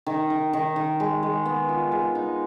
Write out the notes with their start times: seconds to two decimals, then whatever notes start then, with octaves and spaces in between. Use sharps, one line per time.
0.06 D#3
0.30 D#3
0.53 D#3
0.76 D#3
1.00 G#3
1.23 G#3
1.46 B3
1.69 F4
1.92 G#3
2.15 D#4